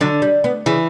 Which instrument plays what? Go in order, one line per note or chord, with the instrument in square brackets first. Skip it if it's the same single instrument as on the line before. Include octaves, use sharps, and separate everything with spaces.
[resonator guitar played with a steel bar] D3 [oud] F#3
[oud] G3
B3
[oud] C#3 [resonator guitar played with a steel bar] E3